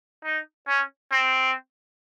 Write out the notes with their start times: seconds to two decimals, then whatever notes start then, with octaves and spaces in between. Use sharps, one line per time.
0.25 D#4
0.68 C#4
1.12 C4